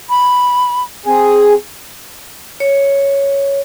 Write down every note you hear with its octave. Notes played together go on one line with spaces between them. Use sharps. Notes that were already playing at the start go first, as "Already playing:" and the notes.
B5
C4 G#4
C#5